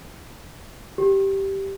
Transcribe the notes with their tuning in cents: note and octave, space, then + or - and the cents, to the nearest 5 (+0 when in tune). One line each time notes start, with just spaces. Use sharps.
G4 -10